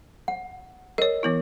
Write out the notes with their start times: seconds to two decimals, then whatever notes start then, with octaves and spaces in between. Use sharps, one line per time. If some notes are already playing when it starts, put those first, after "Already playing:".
0.28 F#5
0.98 A#4 C#5 D#5
1.23 E3 B3 E4